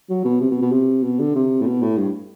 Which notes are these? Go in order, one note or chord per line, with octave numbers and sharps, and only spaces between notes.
F#3
B2
C3
B2
B2
C3
B2
D3
C3
A2
B2
A2
G2